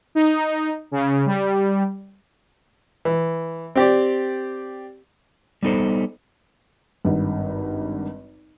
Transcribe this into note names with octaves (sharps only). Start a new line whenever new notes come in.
D#4
C#3
G3
E3
C4 G4 D5
G3 B3 D#4 A4 C5
G#1 G2